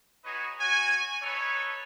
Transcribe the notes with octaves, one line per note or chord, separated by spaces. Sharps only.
D#4 F#4 G#4 B4 C#5 D#5
F#4 C#5 G#5
D#4 A4 B4 C#5